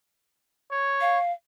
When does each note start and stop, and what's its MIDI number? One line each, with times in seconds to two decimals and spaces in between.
0.72 1.19 73
1.01 1.32 77